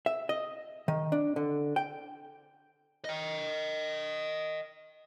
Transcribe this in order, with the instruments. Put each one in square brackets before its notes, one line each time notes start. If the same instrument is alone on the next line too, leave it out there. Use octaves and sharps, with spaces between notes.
[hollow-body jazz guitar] E5
D#5
D#3
D4
D3
G5
[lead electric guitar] D#5 G5